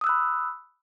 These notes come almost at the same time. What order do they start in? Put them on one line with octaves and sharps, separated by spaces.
D#6 E6 F#6 B5